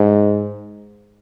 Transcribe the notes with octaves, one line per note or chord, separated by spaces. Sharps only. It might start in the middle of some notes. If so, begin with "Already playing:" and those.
Already playing: G#2